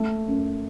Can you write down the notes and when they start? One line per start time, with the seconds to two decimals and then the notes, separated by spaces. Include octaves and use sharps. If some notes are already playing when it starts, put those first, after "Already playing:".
Already playing: A3
0.28 F#2